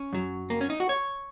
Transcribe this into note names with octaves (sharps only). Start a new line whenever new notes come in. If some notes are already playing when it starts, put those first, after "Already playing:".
Already playing: C#4
F#2 F#3
A#3
C#4
D#4
F#4
C#5